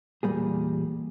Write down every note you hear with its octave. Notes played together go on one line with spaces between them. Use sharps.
E2 A#2 D3 G3 A#3 G#4